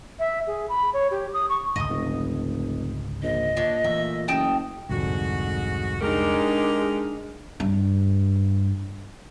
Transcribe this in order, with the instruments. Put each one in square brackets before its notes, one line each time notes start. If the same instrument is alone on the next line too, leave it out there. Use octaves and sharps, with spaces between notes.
[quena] E5
G#4
B5
C#5
G4
D#6
C#6
[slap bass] G#1 C#2 D3 [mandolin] D#5 D#6
[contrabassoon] F1
[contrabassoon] A#1 [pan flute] D#5
[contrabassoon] A#2 [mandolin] D4 C#5
[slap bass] E3 A3 [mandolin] E5
[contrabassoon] F#1 [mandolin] G5 A5 D#6
[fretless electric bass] C2 F2 D3 [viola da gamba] G#2 [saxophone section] F#4
[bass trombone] G#3 [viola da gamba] D4 D#4 [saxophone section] G4 A#4
[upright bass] G2 D4